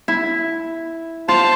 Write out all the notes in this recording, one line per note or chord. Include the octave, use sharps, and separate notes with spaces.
E4
F4 C5 A5